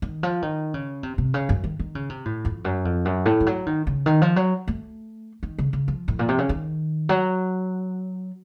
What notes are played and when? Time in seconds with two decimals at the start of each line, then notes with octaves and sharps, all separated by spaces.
0.02 D#3
0.23 F3
0.42 D#3
0.74 C#3
1.03 C3
1.18 C3
1.34 C#3
1.49 F#2
1.64 D#3
1.79 D#3
1.95 C#3
2.10 C3
2.25 A2
2.45 F2
2.65 F#2
2.85 F2
3.05 F#2
3.26 A2
3.40 F3
3.46 F#3
3.66 D#3
3.87 C#3
4.06 D#3
4.22 F3
4.36 F#3
4.68 A3
5.43 D#3
5.59 C#3
5.73 C#3
5.88 F3
6.08 A2
6.19 A#2
6.29 C3
6.39 C#3
6.49 D#3
7.09 F#3